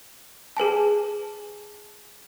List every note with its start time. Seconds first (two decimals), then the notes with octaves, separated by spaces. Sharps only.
0.57 G#4 B4 G#5 A5